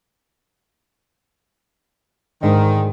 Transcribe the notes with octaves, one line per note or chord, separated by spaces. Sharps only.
D2 G#2 D#3 D4